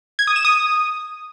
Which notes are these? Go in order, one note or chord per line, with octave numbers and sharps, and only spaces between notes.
G#6
D#6
E7
D#6